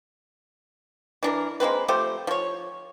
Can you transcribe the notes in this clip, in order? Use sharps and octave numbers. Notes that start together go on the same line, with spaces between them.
E3 D4 A#4
G#3 A#3 C4 B4
F3 A3 G4 C5
F3 C#5